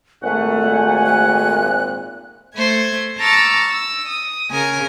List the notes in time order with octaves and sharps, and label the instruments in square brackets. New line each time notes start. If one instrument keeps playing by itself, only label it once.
[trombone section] G#1 A#2 [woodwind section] A3 F#5 [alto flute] G#5
[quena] F#6
[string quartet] A3 C5 G#6
A5 A#5 C#6 D6 E6 F6
E6
D#6
C#3 A#4 G#5